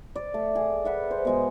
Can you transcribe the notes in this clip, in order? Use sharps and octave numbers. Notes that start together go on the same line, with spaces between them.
D5
A3
G#4
B4 E5 F#5 B5
C5
B2 G#3 G#4